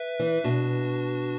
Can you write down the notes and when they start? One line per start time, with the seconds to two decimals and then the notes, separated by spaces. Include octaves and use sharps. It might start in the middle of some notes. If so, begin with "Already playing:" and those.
Already playing: B4 E5
0.19 E3
0.44 B2 D4 F#4